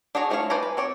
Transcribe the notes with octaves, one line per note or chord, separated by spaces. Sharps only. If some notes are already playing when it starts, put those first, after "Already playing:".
D4 F#4 G#4 C#5 A#5
F3 A3 E4 C#5 F5
B4 C5 D5 G#5 A#5
B4
C4 C#5 D5